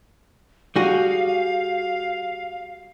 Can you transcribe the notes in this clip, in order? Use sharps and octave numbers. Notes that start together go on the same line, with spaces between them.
G3 F#4 G#4 F5